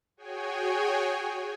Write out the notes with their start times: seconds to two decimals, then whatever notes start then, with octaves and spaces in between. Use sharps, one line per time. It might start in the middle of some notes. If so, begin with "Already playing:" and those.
0.17 F#4 G#4 C#5 G5 G#5